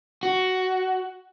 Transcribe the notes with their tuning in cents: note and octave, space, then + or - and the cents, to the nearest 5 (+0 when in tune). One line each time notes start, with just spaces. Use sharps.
F#4 +10